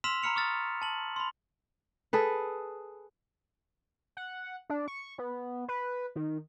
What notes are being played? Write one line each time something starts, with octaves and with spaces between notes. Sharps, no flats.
C6 E6 F6 B6 E7 F7
A#5 B5 F6 C#7 F7
C#6 D#6 F6 A6
A5 F#7
B5 C6
G#4 A4 B4
F#5
D4
C#6
B3
B4
D#3